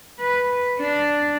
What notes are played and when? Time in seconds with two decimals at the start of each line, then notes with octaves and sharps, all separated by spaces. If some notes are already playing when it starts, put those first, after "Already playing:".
0.20 B4
0.80 D4